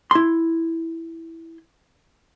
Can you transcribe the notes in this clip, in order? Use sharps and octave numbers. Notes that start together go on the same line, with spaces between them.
E4 C6